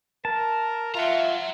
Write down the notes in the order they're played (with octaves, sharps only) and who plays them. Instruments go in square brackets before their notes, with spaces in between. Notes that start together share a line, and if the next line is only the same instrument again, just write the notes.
[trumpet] A#4 [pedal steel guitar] A5
[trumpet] F4 [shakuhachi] E5 [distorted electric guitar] F#5 A#5